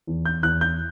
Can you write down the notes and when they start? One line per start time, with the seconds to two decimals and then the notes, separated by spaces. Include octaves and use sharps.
0.07 E2
0.25 G6
0.43 E2 F#6
0.61 G6